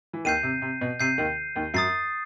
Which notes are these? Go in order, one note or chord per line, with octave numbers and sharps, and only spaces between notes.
E3
D#2 D#3 G6 C7 D#7
C3
C3
B2
C3 G6 C7 D#7
D#2 D#3
D#2 D#3
F#2 F#3 D#6 A6 C7